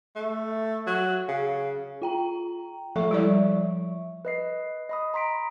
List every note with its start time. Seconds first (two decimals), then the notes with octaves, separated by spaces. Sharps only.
0.16 A3
0.87 F#3
1.29 C#3
2.02 F4 G5 A#5
2.96 F3 A4 E5 C#6
3.11 G3 E4 D5
4.25 B4 D#5 C7
4.89 D#5 B5 D#6
5.14 A#5 C6 B6 D7